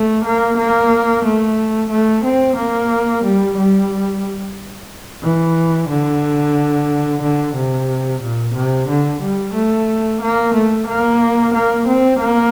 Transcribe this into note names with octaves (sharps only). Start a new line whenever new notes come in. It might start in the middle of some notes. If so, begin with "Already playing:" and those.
Already playing: A3
A#3
A#3
A3
A3
C4
A#3
G3
G3
E3
D3
D3
C3
A#2
C3
D3
G3
A3
A#3
A3
A#3
A#3
C4
A#3